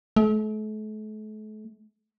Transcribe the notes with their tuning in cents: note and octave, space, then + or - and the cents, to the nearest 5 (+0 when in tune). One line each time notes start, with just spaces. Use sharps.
A3 -40